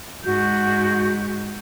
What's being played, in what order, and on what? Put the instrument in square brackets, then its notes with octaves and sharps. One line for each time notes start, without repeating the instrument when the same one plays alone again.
[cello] G#2 [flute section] F#4 G6